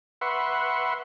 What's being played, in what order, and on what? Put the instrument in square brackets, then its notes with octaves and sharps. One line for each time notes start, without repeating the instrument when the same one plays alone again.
[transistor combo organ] B4 E5 F#5 C6 C#6